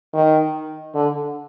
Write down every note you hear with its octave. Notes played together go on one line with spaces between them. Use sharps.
D#3
D3